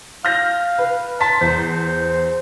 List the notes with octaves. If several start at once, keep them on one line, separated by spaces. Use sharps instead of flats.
F5 F6 G6 A#6
B4
A5 A#5 C6 B6
E2 C5